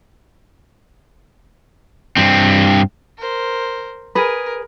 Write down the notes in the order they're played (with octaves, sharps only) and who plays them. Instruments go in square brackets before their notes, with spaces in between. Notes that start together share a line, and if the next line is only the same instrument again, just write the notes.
[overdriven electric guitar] G2 C4
[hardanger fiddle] A#4 C5
[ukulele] G#4 B4 [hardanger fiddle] A#4